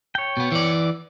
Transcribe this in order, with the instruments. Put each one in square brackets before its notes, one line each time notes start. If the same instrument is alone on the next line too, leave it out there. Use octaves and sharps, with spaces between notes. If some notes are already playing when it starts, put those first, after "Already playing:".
[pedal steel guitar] C#5 G5
[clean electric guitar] B2 B3
E3 D5